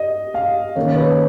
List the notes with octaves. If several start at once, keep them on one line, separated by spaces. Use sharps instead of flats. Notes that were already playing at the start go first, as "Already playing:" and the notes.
Already playing: D#5
F5
D#3 A#3 C#4 C#5
C#5
B4